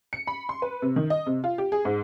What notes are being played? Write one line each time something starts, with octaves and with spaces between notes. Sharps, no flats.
C#7
B5
C6
B4
C3
D#3
D#5
C3
F4
G4
G#4
G#2